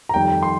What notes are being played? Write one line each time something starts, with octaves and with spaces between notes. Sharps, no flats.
A#5
F2 D#3 G3 G5
C6